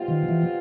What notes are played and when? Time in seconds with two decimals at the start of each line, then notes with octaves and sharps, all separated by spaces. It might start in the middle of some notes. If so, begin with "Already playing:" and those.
Already playing: B2 G3 C4 F4
0.08 D#3
0.29 E3